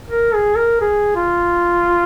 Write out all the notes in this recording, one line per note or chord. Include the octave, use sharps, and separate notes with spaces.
A#4
G#4
A#4
G#4
F4